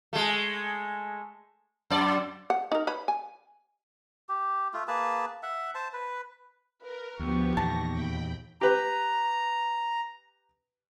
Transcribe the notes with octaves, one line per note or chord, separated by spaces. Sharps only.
G#3 A3
F#2 D5
F#5
D#4 A#4
B4 C#5 B5
G#5
G4
A3 F4
A#3 G#4 B4 A5
E5 F#5
C5 A5
B4
A#4 B4
D2 F3 B3 G4 C#6
E2 A#2 D#3 A5 A#6
D#2 G5 B5
G4 B4 A#5